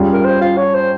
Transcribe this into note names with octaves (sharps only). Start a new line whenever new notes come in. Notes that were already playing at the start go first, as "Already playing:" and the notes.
Already playing: G2 G3 C#4 F4 G#4
A#4
C5
F4
C#5
C5